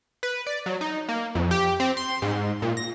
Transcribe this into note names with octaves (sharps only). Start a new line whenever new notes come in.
B4
D5
F#3
D#4
A#3
F2
G4
C4
C6
G#2
A#2
A#6